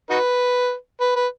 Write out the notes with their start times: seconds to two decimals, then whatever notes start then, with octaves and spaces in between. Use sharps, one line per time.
0.10 D#4 F#4 B4
1.01 B4
1.16 B4